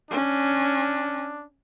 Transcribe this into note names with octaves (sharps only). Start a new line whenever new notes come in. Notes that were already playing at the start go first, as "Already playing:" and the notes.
C#4 D4